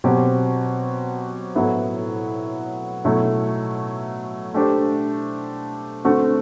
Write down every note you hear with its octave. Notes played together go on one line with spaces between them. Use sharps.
B2 F#3 C4 G4
A2 F#3 B3 E4
B2 F#3 A3 E4
A3 D4 G4 C5
D3 A3 C4 F#4